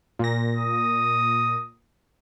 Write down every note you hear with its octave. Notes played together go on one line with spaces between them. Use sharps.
A#2 A#6
D#6